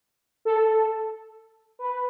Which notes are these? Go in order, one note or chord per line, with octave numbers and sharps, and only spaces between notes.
A4
B4